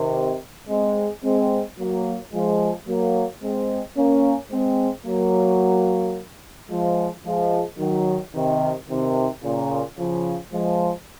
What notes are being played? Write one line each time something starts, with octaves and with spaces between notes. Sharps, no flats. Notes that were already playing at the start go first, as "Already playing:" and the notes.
Already playing: C3 D#3
G#3 C4
G#3 C4
F#3 A#3
F3 G#3
F#3 A#3
G#3 C4
A#3 C#4
G#3 C4
F#3 A#3
F3 G#3
F3 G#3
D#3 F#3
C3 D#3
C3 D#3
A#2 C#3
C#3 F3
F3 G#3